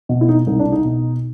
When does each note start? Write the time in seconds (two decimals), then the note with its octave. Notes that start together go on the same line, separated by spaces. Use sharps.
0.09 B2
0.21 E4
0.29 D#4
0.47 C2 D#4
0.59 D4
0.72 D#4
0.85 B2